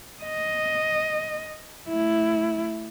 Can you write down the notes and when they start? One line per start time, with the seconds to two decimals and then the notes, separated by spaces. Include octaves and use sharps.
0.24 D#5
1.89 A3 E4